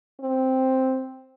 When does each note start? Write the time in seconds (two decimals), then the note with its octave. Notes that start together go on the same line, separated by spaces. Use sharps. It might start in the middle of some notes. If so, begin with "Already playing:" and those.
0.20 C4